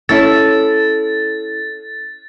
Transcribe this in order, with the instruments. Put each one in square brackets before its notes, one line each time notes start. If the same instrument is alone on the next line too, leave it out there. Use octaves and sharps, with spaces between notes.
[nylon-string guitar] C#4 E4 [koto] A4 [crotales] A6